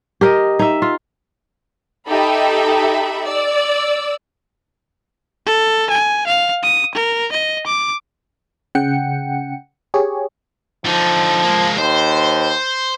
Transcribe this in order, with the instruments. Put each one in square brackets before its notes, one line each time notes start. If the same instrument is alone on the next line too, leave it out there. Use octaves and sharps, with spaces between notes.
[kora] G4 A#4 D#5
D#4 E5
F4
[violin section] D#4 G4 A4 E5 B5
D5 E6
[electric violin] A4
G#5
F5
D#6
A#4
D#5
D6
[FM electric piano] C#3 F#5 G5 C#7
G4 G#4 C#5
[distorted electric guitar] D3 D#4 [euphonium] F3
[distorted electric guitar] G#3 A#3
[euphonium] D#2 [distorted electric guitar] C5